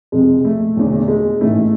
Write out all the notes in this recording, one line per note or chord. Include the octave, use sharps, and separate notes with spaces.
F1 F2 C3 G#3
A3
E1 E2 D3
G#3
A1 G#2 E3 A3